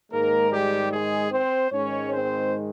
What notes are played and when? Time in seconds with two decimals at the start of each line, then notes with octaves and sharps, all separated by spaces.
0.12 G#2 D#3 G#3 A#3 A#4
0.51 G3 G4
0.91 G#3 G#4
1.31 C4 C5
1.71 G#2 D#3 G#3 C#4 C#5
2.11 C4 C5